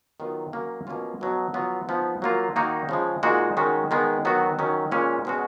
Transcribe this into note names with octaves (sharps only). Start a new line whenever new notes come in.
D#3 F#3 B3 F4
F#3 A#3 C#4
B2 A#3 C#4 F4
B2 F#3 B3
F#3 B3 F4
F3 B3 D#4
F#3 A#3 F4
D#3 A#3 D#4 F#4
C#3 F3 G#3
A#2 G#3 D#4 F#4
D#3 G#3 C#4 F#4
D#3 G#3 B3
D#3 F#3 B3 F#4
D#3 F#3 C#4
A#2 G#3 C#4
B2 G#3 C#4 F#4